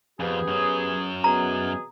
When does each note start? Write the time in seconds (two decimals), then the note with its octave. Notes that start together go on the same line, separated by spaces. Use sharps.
0.20 F2 B3 G4 G#4
0.48 F#2 F#3
1.24 B2 B3 G#4 A#5